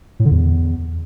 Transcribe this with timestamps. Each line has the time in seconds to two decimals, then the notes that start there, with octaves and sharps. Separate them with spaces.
0.20 A2
0.25 D3
0.31 E2